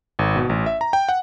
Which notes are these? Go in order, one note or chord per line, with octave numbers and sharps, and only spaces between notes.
G#1
B2
A1
E5
A#5
G5
F#5